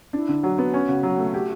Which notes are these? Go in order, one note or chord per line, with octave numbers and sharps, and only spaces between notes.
D4 E4
D3
F#3 F#4
B3
C#4
C#3
F#3
A3
G4